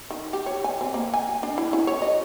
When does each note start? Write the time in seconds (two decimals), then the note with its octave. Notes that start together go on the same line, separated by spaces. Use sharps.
0.10 D#3
0.33 G4
0.46 C#5
0.64 G#5
0.81 C4
0.94 A#3
1.14 G#5
1.43 D4
1.58 E4
1.73 C#4
1.87 C#5
2.02 D#5